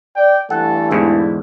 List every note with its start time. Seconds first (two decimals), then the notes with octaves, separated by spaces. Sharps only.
0.16 D5 G5
0.50 G2 E3 A3 A4 F#5
0.91 E2 G#2 D3 E4